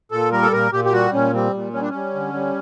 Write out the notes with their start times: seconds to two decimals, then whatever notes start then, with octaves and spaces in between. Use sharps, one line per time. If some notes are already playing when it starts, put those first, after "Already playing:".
0.11 A#2 A4
0.32 G3 A#4
0.43 A4
0.52 A#2 A#4
0.72 A#2 G4
0.85 G4
0.92 G3 F#4
1.13 A#2 C#4
1.33 G3 C4
1.54 A#2
1.73 G3 C#4
1.81 D4
1.89 G3 C#4
2.14 D3
2.34 G3